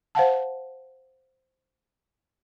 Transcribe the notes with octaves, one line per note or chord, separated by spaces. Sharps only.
C5 F5 F#5 A5